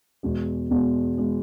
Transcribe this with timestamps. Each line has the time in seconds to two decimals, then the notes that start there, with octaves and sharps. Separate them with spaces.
0.23 E2 B2 G#3
0.71 E2 B2 G#3
1.18 B2 G#3